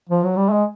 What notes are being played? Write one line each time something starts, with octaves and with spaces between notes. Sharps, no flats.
F3
F#3
G3
G#3